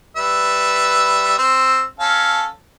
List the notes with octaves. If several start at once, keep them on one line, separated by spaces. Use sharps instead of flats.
G3 B4 E5
C4 E6
C#4 A4 F5